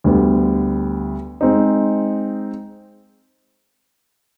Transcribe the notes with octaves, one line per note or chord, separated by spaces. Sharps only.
D2 D3 G3 B3
G#3 C4 D#4